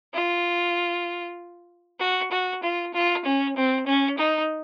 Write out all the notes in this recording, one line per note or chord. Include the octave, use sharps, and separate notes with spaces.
F4
F#4
F#4
F4
F4
C#4
C4
C#4
D#4